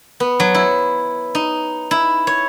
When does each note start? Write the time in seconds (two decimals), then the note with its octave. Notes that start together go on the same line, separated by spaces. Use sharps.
0.20 B3
0.40 F#3
0.55 E4
1.35 D#4
1.91 E4
2.27 C#5